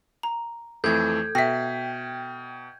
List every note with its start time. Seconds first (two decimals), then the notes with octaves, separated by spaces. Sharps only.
0.23 A#5
0.84 F2 E3 A3 A4 G6 G#6
1.35 B2 E5 G5 A#6 B6